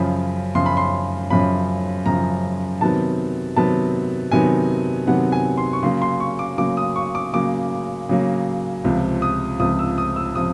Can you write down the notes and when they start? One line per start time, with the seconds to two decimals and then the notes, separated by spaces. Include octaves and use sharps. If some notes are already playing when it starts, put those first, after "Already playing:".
Already playing: F#2 C#3 F3 B5
0.55 F#2 C#3 F3 C6
0.66 B5
0.77 C6
1.30 F#2 C#3 F3 B5
2.06 F#2 C#3 F3 A#5
2.81 C3 D#3 F#3 B3 A5
3.56 C3 D#3 F#3 B3 A5
4.32 C3 D#3 F#3 B3 G#5
5.07 C3 D#3 F#3 B3 F#5
5.32 G#5
5.58 C6
5.73 C#6
5.83 C#3 F#3 A#3 C6
6.02 C6
6.20 C#6
6.39 D6
6.58 C#3 F#3 A#3 D6
6.77 D#6
6.96 C#6
7.15 D6
7.33 C#3 F#3 A#3 D6
8.09 C#3 F#3 A#3
8.84 C#2 C3 F3
9.22 D#6
9.59 C#2 C3 F3 D#6
9.79 E6
9.98 D#6
10.16 E6
10.35 C3 F3 D#6